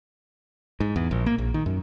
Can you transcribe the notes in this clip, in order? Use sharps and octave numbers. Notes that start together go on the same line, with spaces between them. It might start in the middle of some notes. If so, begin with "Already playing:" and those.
G#2
E2
A#1
A#3
A#1
D#3
F#2